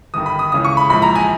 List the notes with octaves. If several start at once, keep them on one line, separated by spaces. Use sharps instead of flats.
G1 G2 D#3 D#6
B5
D#6
C#2 C#3 E3 D#6
C#6
B5
A#1 G#2 E3 B5
A#5
G#5